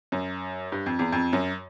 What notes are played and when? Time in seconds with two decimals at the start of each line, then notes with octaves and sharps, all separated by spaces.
0.12 F#2
0.72 G2
0.86 F2
0.99 E2
1.12 F2
1.33 F#2